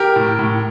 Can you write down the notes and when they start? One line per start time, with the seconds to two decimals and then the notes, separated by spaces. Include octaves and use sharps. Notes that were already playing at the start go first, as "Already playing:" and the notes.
Already playing: G4 A#4
0.16 A2
0.39 A2